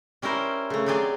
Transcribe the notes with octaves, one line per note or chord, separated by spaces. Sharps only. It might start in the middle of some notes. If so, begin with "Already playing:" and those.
G3 C#4 E4 A#4 C5
C#3 A3
F#3 C4 G4 G#4 D5